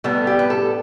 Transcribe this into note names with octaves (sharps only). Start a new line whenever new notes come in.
A2 G3 B3 A4
G4
B4
A4